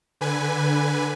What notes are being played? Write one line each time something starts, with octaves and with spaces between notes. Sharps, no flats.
D3 B4 G#5